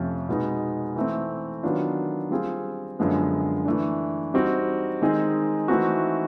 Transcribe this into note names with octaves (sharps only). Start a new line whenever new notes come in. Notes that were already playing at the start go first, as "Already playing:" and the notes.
Already playing: F2 C3 F3 A3 C#4
B2 G#3 B3 D#4
E3 A3 C4
D#3 F#3 B3 D4 F4
G3 C4 F4 G#4
F#2 D3 F3 G#3 B3
E3 A3 D4
G3 C4 D#4 F#4
D#3 G#3 C4 D#4 G#4
E3 A3 C4 D#4 F#4